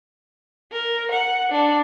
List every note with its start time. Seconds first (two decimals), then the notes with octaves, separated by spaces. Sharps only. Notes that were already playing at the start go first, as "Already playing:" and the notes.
0.72 A#4
1.12 F#5
1.51 D4